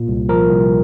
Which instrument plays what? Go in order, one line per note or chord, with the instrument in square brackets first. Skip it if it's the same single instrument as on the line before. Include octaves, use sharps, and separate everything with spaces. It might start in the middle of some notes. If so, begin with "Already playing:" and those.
Already playing: [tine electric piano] A#2
C2
F3 A#4
C2